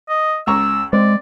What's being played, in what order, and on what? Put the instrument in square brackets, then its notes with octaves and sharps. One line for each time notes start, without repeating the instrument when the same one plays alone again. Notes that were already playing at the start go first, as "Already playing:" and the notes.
[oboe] D#5
[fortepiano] C#2 A#5 C#6 [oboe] E6
[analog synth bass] G#3 [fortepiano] C4 [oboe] D5